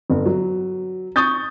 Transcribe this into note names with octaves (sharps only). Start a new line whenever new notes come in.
G1
F#3
C#6 D#6 G6 A6